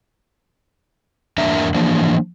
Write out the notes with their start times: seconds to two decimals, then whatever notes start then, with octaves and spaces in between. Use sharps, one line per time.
1.38 E2 A#3 D4 A#4 E5 A#5
1.74 E3 F3 A#3 D4